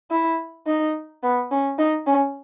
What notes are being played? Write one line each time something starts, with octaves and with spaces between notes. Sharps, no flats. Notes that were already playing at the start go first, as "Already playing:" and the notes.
E4
D#4
B3
C#4
D#4
C#4